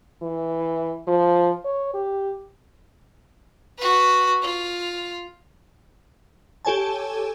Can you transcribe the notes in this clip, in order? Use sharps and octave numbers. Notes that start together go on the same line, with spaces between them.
E3
F3
C#5
G4
F#4 B4
F4
G4 A4 C#5 G#5 A5